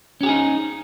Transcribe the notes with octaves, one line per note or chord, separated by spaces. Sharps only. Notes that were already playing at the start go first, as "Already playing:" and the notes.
C#4 D#4 G4 G#4